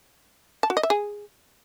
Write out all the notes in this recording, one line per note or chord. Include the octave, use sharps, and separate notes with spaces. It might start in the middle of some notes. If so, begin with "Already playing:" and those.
A5
F#4
D#5
E5
G#4